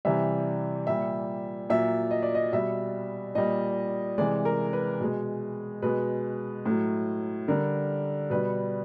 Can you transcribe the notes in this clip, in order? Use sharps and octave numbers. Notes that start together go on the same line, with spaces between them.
C3 E3 G3 E5
A#2 G3 E5
A#2 F#3 E5
D#5
D5
D#5
B2 G3 E5
A#2 G3 D#5
C3 E3 G#3 D5
A#4
B4
B2 G#3
B2 G#3 B4
A2 F#3
D3 G3 A#4
B2 G3 B4